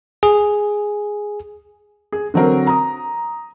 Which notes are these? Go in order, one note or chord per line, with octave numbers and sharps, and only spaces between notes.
G#4
G#4
D3 F#3 C4 A#4
A#5 D#6